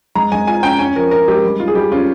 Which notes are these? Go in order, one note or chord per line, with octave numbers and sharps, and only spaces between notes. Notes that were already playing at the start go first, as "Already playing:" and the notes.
G#3 A#5
G#3 G#5
F4 G#5
C#4 G5
C#4 G#5
F3 A#4
C#4 A#4
G#3 G4
G3
D#3 F4
G#4
G3 G4
C#4 F4